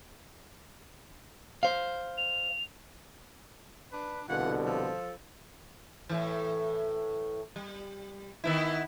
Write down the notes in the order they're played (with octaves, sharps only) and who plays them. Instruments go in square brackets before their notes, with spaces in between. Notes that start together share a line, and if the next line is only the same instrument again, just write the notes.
[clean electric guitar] C5 F5
[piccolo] F7
[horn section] D4 B4
[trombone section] C2 B2 D3 [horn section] E3 F4 F#5
[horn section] F3 A4
[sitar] A2 E3
G3
D#3 B3 E4